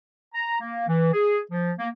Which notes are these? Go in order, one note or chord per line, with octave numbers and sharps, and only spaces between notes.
A#5
A#3
E3
G#4
F3
A#3